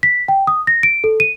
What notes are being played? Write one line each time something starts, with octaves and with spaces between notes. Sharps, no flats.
B6
G5
D#6
A#6
D7
A4
D#7